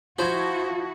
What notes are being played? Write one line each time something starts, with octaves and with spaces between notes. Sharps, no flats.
F3 E4 F#4 C5 B5 G#6